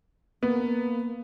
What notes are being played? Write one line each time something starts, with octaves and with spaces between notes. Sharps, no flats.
A#3 B3